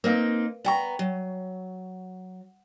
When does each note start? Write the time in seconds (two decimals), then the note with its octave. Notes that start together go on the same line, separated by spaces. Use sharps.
0.04 A#3 C4 D#4 A#4 B4 F5
0.65 B3 D5 G5 A5 A#5 C#6
0.99 F#3